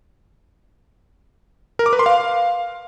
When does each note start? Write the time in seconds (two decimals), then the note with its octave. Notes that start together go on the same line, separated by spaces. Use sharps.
1.79 A#4
1.86 D6
1.93 B4
1.99 C6
2.06 F5